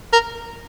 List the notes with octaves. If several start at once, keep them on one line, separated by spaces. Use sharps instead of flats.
A#4